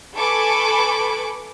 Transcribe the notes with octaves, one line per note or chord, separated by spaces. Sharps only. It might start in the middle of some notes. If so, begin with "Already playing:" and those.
A4 B4 G#5 B5 C#6 D6